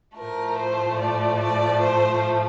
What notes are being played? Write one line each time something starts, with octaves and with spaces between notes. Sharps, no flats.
A2 F3 A3 A#4
C5
D5
D5
C5